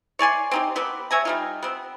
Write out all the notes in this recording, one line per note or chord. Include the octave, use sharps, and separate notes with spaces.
C#5 D5 G#5 C6
C4 D#4 G4
B3 C4 G4 B4
C#5 E5 G#5 A#5
G3 D#4 F4
B3 C4